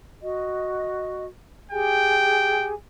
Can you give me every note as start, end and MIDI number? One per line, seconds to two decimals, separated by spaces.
0.22 1.24 66
0.22 1.24 75
1.72 2.74 67
1.72 2.74 68
1.72 2.70 79
1.72 2.74 80